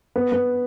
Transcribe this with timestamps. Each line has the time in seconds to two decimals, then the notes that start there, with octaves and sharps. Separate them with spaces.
0.16 B3
0.32 B3